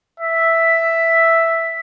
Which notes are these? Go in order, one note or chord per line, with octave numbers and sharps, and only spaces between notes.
E5